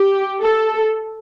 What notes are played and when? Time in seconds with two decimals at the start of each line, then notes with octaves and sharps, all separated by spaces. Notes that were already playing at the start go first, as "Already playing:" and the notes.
Already playing: G4
0.42 A4